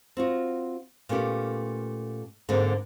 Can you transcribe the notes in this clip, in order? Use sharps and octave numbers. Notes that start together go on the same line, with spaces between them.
C4 F4 F#4
A#2 A3 B3 C#4 G4
G#2 D3 G#3 A#3 C4